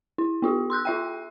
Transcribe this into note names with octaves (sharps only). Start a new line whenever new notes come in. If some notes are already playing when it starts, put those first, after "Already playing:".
E4
B3 F4 G4
C6 E6 F#6 G6
F4 E5 G5